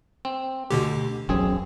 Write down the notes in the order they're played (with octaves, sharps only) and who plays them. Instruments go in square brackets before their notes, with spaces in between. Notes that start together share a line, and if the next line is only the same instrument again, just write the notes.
[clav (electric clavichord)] C4
[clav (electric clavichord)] D2 [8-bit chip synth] B2 D3 G4
[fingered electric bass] E1 B1 F#2 [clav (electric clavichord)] C4 G#4